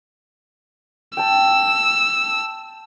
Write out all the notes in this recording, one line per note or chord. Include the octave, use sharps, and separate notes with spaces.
G5 A5 E6